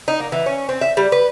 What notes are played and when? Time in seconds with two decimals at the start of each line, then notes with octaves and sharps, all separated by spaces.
0.08 D#4
0.20 A#3
0.32 E3
0.46 C#4
0.69 C4
0.81 E5
0.97 G3
1.12 B4